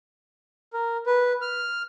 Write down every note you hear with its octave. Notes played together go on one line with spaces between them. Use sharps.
A#4
B4
F6